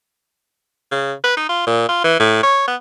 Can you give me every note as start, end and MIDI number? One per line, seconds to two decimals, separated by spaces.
0.92 1.13 49
1.24 1.35 71
1.37 1.47 63
1.49 1.67 65
1.67 1.84 46
1.89 2.02 65
2.04 2.17 52
2.20 2.40 45
2.43 2.63 73
2.67 2.75 59